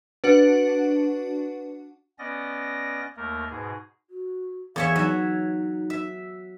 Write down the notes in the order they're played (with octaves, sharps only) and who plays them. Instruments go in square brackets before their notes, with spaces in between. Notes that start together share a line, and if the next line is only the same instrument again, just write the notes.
[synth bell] D4 F#4 F#5 [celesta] B4
[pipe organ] B3 C#4 D5 D#5 A#6
D#2 A3 A#3 A#4
G#2 B2 G#4
[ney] F#4
[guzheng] E2 C#5 E5 [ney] F5
[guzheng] F#3 E5 [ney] D#4
[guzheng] E5